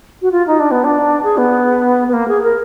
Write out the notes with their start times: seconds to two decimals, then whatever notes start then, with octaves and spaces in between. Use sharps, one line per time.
0.22 F#4
0.32 F4
0.47 D#4
0.60 D4
0.71 B3
0.84 D4
1.23 G#4
1.38 B3
2.08 B3
2.13 A#3
2.28 G#4
2.43 A#4